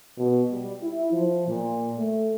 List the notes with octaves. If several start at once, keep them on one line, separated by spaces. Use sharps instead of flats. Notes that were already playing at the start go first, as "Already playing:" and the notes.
B2
G3
E4
F3
A#2
A3